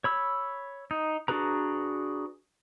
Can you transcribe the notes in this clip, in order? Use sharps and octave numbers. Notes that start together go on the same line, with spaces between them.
C#5 B5 E6
D#4
D4 F#4 G#4 B4 A#5